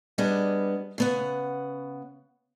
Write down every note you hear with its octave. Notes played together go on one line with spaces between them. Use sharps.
G3 B3 D4 G#4 D#5
C#3 B3 F#5